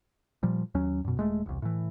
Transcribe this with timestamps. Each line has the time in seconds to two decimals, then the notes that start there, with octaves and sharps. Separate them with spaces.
0.43 A#2 F3 G3
0.74 D#2 F#3 C#4
1.05 F#2 B2
1.17 D#1 G#3 A3
1.46 E1 C2
1.62 A2 E3